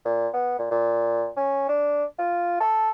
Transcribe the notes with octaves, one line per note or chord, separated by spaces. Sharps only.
A#2
B3
A#2
A#2
C#4
D4
F4
A4